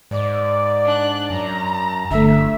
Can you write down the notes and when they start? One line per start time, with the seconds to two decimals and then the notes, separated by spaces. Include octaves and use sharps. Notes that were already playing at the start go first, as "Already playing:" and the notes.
0.11 G#2 D5
0.85 D4 F#6
1.30 F#2 A#5
2.11 G1 D3 A3 E5